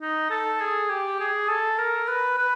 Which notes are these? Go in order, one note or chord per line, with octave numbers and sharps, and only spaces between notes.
D#4
A4
G#4
G4
G#4
A4
A#4
B4
B4